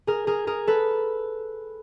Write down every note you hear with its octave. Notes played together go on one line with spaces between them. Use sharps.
G#4 A#4
G#4 A#4
G#4 A#4
A4 B4